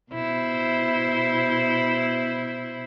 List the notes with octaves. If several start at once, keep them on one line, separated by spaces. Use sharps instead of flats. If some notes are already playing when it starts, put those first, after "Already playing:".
B2 E4 C5